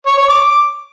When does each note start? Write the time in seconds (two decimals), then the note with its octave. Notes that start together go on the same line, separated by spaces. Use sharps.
0.06 C#5
0.17 C#5
0.29 D6